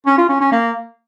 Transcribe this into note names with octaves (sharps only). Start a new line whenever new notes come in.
C#4
F4
C#4
C#4
A#3